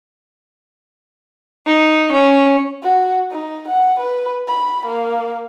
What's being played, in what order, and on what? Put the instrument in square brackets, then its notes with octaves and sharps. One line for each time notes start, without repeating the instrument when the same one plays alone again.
[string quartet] D#4
C#4
[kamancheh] F#4
D#4
F#5
B4
B5
A#3